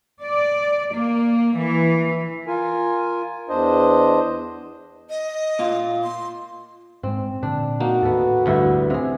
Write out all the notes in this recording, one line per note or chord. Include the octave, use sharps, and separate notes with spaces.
D5
A#3
E3
F4 A#4 G#5
E2 D4 C5 D#5
D#5
A#2 F4
C6
G#2 G#3 C4
A#2 D3 D4
A#3 D#4 F#4
D#2 A2 B3 A4
D2 G2 B3 E4
C3 G#4